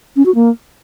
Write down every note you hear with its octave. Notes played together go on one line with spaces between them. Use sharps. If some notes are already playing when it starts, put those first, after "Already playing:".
C#4
F#4
A#3